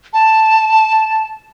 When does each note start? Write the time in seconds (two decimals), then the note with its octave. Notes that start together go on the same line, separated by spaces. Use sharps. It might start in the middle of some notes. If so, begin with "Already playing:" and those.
0.13 A5